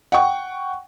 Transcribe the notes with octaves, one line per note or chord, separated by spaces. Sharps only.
F#5 G5 C#6